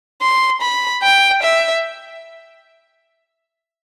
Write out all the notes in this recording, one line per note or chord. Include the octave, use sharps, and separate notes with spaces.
C6
B5
G5
E5